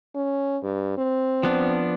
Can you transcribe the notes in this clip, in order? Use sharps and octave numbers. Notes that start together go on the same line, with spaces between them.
C#4
G2
C4
F3 B3 D4